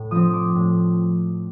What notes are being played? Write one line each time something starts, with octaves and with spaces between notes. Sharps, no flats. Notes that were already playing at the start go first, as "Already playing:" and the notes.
Already playing: A2
F3 C4 D#6
D6
A2